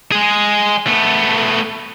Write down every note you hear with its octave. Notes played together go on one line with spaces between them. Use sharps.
G#3 G#4
A3 B3